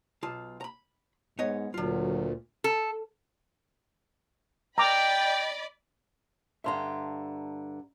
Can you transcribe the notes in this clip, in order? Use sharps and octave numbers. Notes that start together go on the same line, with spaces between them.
B1 F4 A5
A#5 B5
G#2 B3 C#5 D#5
D2 A#2 D3 F#3 F4
A4
D5 D#5 G5 A#5 B5 D6
G2 D3 E5 A#5 C6